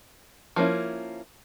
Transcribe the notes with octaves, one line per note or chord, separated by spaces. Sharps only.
F3 A#3 C#4 E4